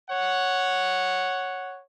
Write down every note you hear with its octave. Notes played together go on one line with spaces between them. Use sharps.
C#5 F#5